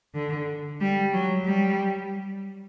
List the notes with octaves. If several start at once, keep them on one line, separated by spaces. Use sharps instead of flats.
D3
G3
F#3
G3